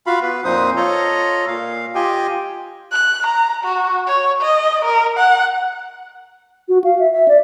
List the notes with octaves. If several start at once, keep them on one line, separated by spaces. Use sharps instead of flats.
F4 F#4 F5 B5
B3 B4
F2 A#2 F3 D#4 C5 D#6
F4 A4 C#5 D#5 A#5
A#2 F5
F4 G4 D#5 G5 G#5
F#6
A#5
F#4
C#5
D#5
A#4
F#5
F#4
F5
E5
E5
D5